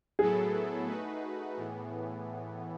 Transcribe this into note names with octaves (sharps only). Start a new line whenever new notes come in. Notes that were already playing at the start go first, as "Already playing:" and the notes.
A2 F#3 B3 E4 G#4 A4
A3 D#4 F#4 B4
A2 E3 B3